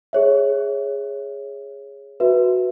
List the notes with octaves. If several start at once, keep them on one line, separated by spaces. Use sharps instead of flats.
G#4 C#5 E5
F#4 B4 E5